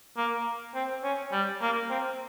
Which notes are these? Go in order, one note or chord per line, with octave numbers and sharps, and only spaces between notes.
A#3
C4
C#4
G3
A#3
C4